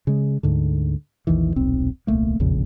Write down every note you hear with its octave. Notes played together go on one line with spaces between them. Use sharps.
C#3 G#3
D2 G#2 D3
A#1 E2 D#3 E3
D#1 B1 C4
D#1 C2 A3 A#3
E1 A#1 F2 C#3